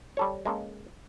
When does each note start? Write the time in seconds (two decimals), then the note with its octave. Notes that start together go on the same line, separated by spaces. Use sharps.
0.17 G3 A4 C#5
0.45 G#3 A#3 C#4 A4